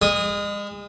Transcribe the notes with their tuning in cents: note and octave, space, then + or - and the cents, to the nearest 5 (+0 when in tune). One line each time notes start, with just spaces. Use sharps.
G#3 -35 D#6 +0